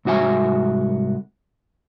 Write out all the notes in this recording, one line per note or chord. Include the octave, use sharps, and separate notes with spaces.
C2 G#2 F#4 E5 G#5